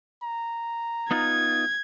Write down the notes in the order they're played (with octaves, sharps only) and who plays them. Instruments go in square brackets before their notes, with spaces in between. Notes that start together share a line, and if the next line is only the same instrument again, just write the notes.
[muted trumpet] A#5
[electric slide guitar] B3 D#4 F4 [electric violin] G#6